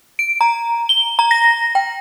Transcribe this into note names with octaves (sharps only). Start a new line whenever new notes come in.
D7
A#5
G7
A#5
A#6
G5